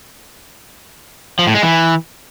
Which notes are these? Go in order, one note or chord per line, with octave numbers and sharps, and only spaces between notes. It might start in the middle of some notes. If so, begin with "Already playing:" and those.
F3
A2
G#3
E3